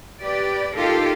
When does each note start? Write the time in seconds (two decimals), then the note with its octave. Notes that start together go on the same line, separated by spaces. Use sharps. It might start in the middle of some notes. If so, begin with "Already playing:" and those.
0.21 G4 B4 D5
0.75 D#4 F4 G4 A4 A#4